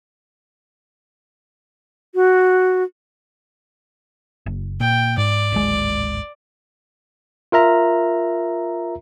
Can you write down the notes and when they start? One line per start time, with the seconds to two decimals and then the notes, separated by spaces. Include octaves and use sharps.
2.15 F#4
4.46 F#1
4.80 A#2 G5
5.18 G#2 D5
5.52 D1 G#1 G#3
7.52 F4 A#4 E5 A#5